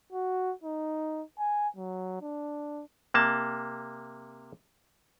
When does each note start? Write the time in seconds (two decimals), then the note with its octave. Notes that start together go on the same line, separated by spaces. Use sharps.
0.13 F#4
0.64 D#4
1.39 G#5
1.77 F#3
2.21 D4
3.14 C3 A#3 A5